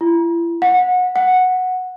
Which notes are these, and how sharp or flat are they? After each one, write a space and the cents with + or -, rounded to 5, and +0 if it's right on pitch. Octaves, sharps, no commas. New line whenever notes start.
E4 +40
F#5 -25
F#5 -5